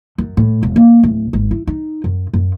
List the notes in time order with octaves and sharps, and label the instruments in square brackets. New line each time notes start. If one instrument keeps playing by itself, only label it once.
[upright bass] F#2
A2
E1
A#3
D1
G#1
E4
D#4
F#2
F#2